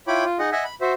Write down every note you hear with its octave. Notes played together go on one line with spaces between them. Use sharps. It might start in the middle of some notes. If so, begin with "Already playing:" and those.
E4 F4 C#5 G5 B5 D6
F4
D#4 G#4 D#5 F#5
D#5 E5 F#5 G#5
B5
F#4 C5 E5